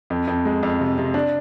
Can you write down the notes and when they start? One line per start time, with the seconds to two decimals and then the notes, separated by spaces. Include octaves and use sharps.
0.10 F2
0.27 F2
0.45 G#3
0.63 F2
0.80 C3
0.98 C3
1.14 D4